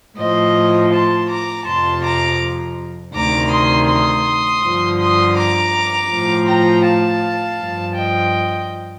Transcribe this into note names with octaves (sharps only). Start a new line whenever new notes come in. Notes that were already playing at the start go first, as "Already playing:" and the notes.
A2 F3 C5 D#5
A5 C6
A#5 D6
F2 C3 F3 A5 C6
A#5 D6
D2 C3 D#3 A#5 D6
C6 D#6
C6 D#6
G2 D3 F3
C6 D#6
A#5 D6
A2 F3
G5 A#5
F5 A5
G2 F3
D#5 G5